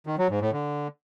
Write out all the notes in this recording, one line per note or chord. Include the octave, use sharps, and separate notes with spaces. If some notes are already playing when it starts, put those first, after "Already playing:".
D#3
F#3
G#2
A2
D3